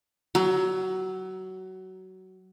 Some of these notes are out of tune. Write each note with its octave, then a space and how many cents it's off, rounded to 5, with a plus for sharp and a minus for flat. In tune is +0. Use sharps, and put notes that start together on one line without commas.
F#3 +20